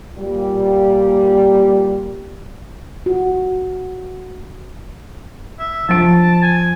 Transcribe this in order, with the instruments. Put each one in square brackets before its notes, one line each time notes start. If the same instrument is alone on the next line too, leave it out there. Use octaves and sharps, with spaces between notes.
[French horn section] A#2 G3
[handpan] F#4
[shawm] E5
[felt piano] F3 D7 [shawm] A5
[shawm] G#5